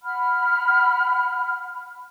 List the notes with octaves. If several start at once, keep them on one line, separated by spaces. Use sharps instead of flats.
F#5 B5 F6